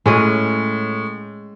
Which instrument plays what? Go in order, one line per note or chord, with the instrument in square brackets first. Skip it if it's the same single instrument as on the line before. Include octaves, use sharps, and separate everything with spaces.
[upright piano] A2 [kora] G#3 C#4 G#4